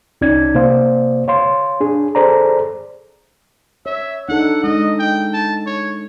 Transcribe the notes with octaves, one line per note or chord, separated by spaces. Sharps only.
C2 C#4 D#4 D5 G#6
C3 A#3 C5 D5 F5
C#5 F5 C6
D4 G#4
G#4 A4 C5 D5 A#5
C#5 E5
D4 D#4 A4 F#5
G#3 D#4 D#5
G5
A5
C#5